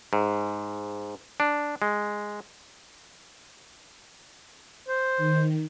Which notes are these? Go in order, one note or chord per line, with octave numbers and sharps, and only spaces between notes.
G#2
D4
G#3
C5
D#3